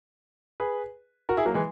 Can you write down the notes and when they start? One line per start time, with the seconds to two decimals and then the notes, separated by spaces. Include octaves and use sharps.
0.60 G#4 B4
1.29 F#4 A#4
1.37 E4 G#4
1.45 F#3 A#3
1.54 E3 G#3